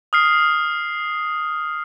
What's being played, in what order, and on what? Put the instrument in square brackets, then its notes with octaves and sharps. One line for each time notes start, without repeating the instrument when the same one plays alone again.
[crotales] D#6 F6 C7